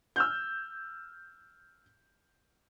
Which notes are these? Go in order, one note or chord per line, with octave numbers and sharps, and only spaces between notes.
E6 F6 G6